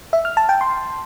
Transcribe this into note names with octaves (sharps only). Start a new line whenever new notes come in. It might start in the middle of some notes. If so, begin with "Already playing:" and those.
E5
F6
A5
G5
C6